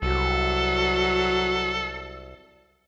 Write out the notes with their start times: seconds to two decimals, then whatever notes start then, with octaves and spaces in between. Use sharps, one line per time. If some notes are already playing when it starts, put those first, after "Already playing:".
0.02 C2 F#3 A4